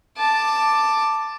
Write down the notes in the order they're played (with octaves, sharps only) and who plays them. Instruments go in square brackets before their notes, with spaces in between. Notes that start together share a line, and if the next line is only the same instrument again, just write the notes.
[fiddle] A5 D6